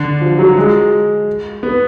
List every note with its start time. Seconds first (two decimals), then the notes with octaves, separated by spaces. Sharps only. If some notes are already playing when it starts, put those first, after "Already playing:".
Already playing: D3
0.21 F3
0.39 F#3
0.57 G#3
1.63 B3